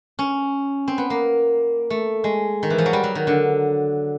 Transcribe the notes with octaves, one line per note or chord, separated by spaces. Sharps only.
C#4
C4
B3
A#3
A3
G#3
D#3
E3
F3
F#3
G3
F#3
D#3
D3